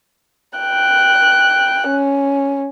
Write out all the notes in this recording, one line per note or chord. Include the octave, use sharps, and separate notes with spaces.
G5 F#6
C#4